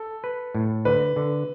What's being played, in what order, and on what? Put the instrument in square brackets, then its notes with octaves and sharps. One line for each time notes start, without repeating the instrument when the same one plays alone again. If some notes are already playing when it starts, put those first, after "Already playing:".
Already playing: [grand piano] A4
[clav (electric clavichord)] B4
A2
[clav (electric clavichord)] D3 [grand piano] B4
[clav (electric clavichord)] D3